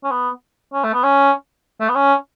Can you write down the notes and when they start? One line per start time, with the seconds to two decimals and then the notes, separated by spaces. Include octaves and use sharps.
0.04 C#4
0.11 B3
0.73 C#4
0.84 A3
0.93 B3
1.03 C#4
1.80 A3
1.89 B3
1.95 C#4